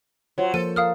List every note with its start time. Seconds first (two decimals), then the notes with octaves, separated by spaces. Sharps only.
0.38 F#3 F4 C5 C#5
0.54 F3 A#3 A4 C5 D#7
0.76 A#4 F5 D#6 F6